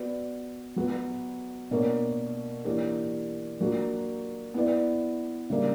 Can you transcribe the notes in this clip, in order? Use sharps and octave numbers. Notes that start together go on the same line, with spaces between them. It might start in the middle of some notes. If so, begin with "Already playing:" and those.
Already playing: B3 F#4 B4 D5
F#3 B3 F#4 B4
B2 A#3 D4 A#4 C#5
E3 A#3 D4 G4 C#5
F#3 A#3 D4 F#4
B3 E4 B4 D5
C#3 G3 A#3 D4